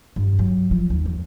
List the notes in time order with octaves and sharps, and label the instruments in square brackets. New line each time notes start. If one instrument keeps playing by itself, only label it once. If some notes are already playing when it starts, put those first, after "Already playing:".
[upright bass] G2
F#3
F3
D#2
F2